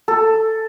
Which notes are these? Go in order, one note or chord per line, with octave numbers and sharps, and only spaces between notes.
A4